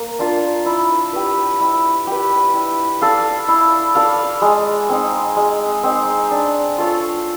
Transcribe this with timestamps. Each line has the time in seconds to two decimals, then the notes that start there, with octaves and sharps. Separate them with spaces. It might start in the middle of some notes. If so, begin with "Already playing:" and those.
Already playing: A#3
0.19 D4 F4 A#4
0.66 E4
1.13 G4 B4
1.61 E4
2.07 G4 B4
2.53 E4
3.01 A4 D5 F5
3.48 E4
3.95 A4 D5 F5
4.42 G#3
4.89 C4 D#4
5.36 G#3
5.84 C4 D#4
6.31 D4
6.78 F4 A4 C#5